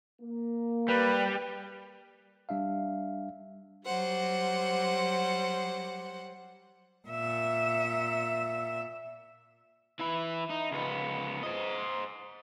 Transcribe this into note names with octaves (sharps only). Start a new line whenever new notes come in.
A#3
G3 B4
G3 D4 E5 F5
F#3 G3 C5 F#5
A#2 E5
E3 E4
D#4
C#2 B3
C5 D#5